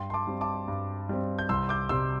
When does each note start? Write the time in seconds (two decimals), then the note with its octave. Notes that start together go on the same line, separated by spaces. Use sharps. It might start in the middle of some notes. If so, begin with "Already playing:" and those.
Already playing: G2 G5 C6
0.10 C6
0.13 A5 D6
0.27 G3 C4
0.41 A5 D6
0.68 G2
1.09 G3 C4
1.39 G6
1.49 C2 C6 E6
1.69 D6 G6
1.89 C3 G3 C6 E6